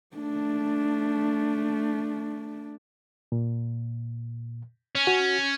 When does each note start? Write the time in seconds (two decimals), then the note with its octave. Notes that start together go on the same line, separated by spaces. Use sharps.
0.16 A3 D4
3.32 A#2
4.95 C#4
5.07 F#4